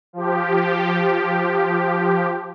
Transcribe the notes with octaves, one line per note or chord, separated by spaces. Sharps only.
F3 G4